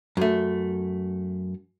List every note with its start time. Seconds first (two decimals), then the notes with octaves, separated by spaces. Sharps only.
0.17 F#2 A3